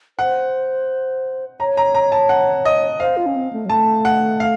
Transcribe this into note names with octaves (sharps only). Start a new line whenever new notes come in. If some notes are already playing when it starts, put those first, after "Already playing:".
C5 F#5
C#5 A#5
A#5
A#5
A5
F#5
D#5
C5 F5
F4
C#4
C4
A3
F#3
A3 A5
F#5
F5